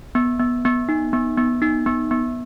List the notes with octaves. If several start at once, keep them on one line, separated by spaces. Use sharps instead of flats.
B3
B3
B3
D#4
B3
B3
D#4
B3
B3